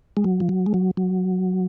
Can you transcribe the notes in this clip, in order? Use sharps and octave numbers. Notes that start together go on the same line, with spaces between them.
G#3
F#3
F3
F#3
G#3
F#3
F#3